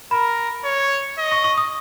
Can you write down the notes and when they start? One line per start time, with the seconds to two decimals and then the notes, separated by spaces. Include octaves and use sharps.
0.11 A#4 B5
0.64 C#5
1.18 D#5
1.32 C#6
1.44 C#6
1.58 D#6